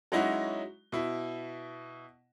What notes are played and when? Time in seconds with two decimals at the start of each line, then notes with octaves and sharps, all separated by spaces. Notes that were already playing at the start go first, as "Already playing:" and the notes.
0.12 F#3 G#3 C#4 D#4 E4 F#4
0.92 B2 E4